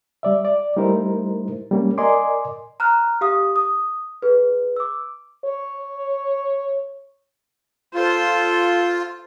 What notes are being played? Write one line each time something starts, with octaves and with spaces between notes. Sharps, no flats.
G3 D5 E5
D5
G3 A3 D#4 E4 A#4 C5
G3 A#3 C#4
A#4 D5 D#5 G#5 C6 D6
A#5 F6 F#6
G4 F5 D#6
D#6
G#4 B4
D6 E6
C#5
F4 A4 C5